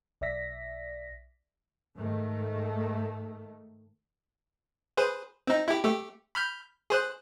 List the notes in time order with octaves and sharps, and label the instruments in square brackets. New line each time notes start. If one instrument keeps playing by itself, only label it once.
[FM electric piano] B1 D5 E5 A#6 B6
[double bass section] G#2 D#3 A3
[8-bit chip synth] G#4 B4 C5
C4 D#4
E4 G4
A3 G4
B5 F6 G6
G#4 C5 F#6